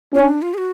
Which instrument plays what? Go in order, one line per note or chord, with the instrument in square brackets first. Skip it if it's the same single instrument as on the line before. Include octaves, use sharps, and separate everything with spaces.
[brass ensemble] C#4 [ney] F4
[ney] D4
F4
G#4
F#4